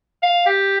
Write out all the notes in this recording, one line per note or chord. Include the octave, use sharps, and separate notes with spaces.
F5
G4